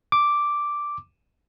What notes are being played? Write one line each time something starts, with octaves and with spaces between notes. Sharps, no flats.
D6